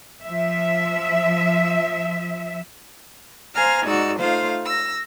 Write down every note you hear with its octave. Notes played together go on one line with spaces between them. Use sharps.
F3 E5
C5 F5 G#5 A#5 F6
G#2 D#4 F#4 D5 E6
A3 D#4 F4 C5 F5
E6 A#6